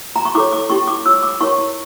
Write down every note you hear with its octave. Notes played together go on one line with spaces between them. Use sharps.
A#5
C#6
E4 A4 C#5 D6
D6
C#4 E4 G4 C#6
D6
F4 C#5 E6
D6
E4 A#4 C#5 C#6